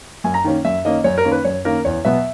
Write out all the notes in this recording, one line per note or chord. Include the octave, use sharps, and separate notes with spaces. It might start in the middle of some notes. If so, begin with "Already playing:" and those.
F#2 G#5
A#5
D#3 A#3 C#4
F#2 E5
D#3 A#3 C#4 D#5
F#2 C#5
A#4
D#3 A#3 C#4
B4
F#2 C#5
D#3 A#3 C#4 A#4
E2 C#5
B2 F#3 B3 E5